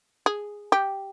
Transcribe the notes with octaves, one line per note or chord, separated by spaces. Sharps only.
G#4
G4